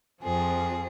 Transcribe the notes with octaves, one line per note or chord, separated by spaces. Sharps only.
F2 F3 C4 G#4